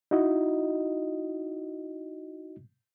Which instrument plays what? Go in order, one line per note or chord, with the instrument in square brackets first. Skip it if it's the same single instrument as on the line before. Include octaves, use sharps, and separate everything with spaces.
[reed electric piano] D#4 E4 F#4 D#5